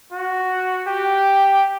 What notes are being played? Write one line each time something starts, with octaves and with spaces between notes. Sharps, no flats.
F#4
G4